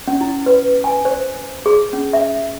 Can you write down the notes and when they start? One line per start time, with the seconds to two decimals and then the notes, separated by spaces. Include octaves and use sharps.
0.08 C#4
0.21 E4
0.46 B4
0.84 G#5
1.05 C5
1.66 G#4
1.93 C#4
2.13 E5